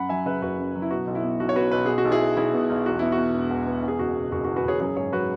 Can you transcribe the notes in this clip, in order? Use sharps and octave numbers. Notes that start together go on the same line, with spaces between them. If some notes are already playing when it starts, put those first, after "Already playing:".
Already playing: F#2 F#5 B5
F#3 E5 G#5
C#3 B4 E5
F#1 F#4 B4
F#2
F#3
E4
B2 F#4
B1
E4
B3
B1 F#4
C#5
B2 F#4 B4
B1 B4
B2 G#4
F#4
B1
E4 G#4
B3
B1 E4 G#4
B2
B1
E2 F#4
B3 E4
F#4
B2
E1
E2
B3
E2 G#4
F#1 F#4
B2
F#1 F#4
F#4
E2
F#4 B4
F#1 G#4 C#5
F#2 G#4 C#5
G#1 G#4 C#5
F#3 F#4 B4